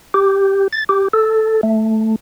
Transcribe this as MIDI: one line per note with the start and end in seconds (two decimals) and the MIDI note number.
0.14 0.68 67
0.73 0.84 93
0.89 1.08 67
1.13 1.61 69
1.63 2.16 57